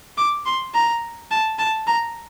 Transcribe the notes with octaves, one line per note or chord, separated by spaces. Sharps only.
D6
C6
A#5
A5
A5
A#5